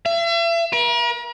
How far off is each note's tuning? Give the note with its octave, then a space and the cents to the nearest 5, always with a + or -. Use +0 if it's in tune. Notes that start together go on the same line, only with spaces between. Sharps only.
E5 +40
A#4 +45